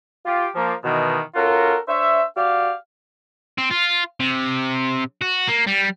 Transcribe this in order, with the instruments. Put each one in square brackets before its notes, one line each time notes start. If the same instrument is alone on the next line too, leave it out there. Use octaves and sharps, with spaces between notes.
[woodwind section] F4 G4
F3 A#3
B2 D#3 E3
C#4 F4 F#4 A4 A#4
D4 C5 C#5 E5
F#4 G4 D5 F5
[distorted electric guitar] C4
F4
C3
F#4
A#3
G3